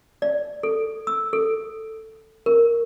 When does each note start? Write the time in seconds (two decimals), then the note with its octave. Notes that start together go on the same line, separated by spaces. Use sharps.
0.22 D5
0.63 A4
1.07 E6
1.33 A4
2.46 A#4